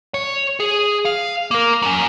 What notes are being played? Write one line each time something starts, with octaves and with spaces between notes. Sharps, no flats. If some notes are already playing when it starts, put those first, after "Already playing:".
C#5
G#4
F5
A#3 A#4
F#3 C#4